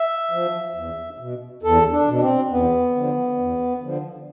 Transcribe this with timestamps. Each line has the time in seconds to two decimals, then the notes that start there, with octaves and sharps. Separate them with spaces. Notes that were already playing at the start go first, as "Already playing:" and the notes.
Already playing: E5
0.31 F3
0.74 E2
1.19 B2
1.63 E2 A4
1.91 D4
2.07 B2
2.13 D4
2.21 C4
2.50 E2 B3
2.95 D3 F3
3.38 E2
3.82 D3 F3